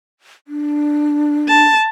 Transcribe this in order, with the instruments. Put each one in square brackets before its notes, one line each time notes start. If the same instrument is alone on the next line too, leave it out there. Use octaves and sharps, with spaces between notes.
[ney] D4
[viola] A5